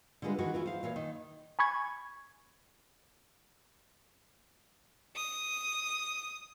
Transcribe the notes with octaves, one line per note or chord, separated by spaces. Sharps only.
D3 G3 G#3 F4 B4
D#3 E3 F#4
E3 E4 F4
C5 F5
A#2 E3 C#5 F5
D#3
G#5 B5 C#6 G#6
D#6